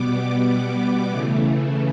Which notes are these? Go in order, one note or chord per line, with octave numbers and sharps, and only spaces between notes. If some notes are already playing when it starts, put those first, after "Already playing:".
Already playing: B2 G3 B3 D6
C#3 E3 A3